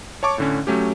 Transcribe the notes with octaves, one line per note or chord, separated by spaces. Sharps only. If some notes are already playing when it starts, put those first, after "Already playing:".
C#5 A5 C#6 D6
A2 D3 C#4
F#3 A3 C#4 G4